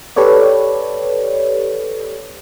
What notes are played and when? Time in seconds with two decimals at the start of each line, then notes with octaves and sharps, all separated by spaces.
0.16 G4 A4 B4 C#5 D5